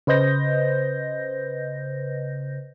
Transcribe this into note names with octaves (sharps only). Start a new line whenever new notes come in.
C#3 B4 C5 D#5 G6 A#6